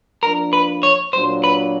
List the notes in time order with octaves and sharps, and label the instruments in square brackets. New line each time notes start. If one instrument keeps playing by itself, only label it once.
[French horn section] F3 A#3 D4 [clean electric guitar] A#4
[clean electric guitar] B4
C#5
[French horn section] A#2 F#3 A#3 D4 [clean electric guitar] C5
[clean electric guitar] B4